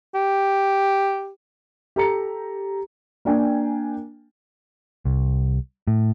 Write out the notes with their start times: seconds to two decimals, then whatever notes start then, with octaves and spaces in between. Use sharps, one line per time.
0.15 G4
1.96 G4 A4 A#5 C#7
3.25 A#3 D4 G5 G#5
5.05 C2
5.87 A2